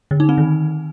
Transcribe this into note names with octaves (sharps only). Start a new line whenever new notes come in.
D3
D#4
C4
D#3